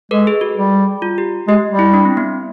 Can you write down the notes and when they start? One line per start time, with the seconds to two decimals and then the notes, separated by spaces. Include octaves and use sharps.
0.11 G#3 A4 B4
0.27 G#4
0.41 F#4
0.57 G3
1.02 F4
1.18 G4
1.48 G#3 G4
1.71 G3
1.79 E4
1.94 D4
2.05 C4
2.17 B3